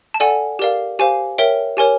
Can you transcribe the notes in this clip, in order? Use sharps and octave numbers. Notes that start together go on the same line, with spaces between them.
A5
A4 D5 F#5 G#5
G4 A#4 D5 F5
G4 C5 F5 G#5
A#4 C#5 E5 G5
G4 A#4 C#5 G#5